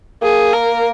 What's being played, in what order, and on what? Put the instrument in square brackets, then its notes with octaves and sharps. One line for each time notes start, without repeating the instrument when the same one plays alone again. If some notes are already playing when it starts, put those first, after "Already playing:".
[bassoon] A#3 [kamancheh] G#4
[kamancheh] A#4